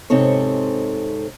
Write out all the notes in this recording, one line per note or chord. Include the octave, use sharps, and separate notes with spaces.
G#2 C3 C4 D#4 A4 C#5